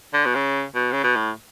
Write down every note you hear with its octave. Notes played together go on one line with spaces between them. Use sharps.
D3
B2
C#3
B2
C#3
B2
A2